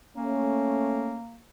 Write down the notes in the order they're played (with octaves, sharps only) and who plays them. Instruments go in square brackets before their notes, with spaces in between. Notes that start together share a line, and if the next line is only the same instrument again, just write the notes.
[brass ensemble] A3 C#4 [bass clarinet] A#3